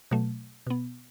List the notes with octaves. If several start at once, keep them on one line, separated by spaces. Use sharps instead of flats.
B2 F#3 A3
B2 B3